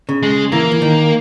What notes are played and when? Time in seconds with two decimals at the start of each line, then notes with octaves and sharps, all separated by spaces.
0.09 C#3
0.23 G#3
0.52 E3 A#3
0.72 E3
0.82 D#3